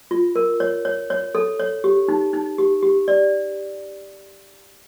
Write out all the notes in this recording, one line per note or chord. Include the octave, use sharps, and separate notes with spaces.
F4
A#4
C#5
C#5
C#5
A4
C#5
G4
D#4
D#4
G4
G4
D5